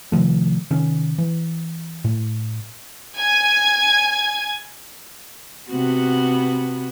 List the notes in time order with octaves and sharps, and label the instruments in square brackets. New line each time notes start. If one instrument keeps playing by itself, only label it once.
[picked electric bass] C3 D#3 F3 A3
C3 D#3 C#4
E3
A2
[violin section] G#5 G#6
[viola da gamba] C3 B3 F#4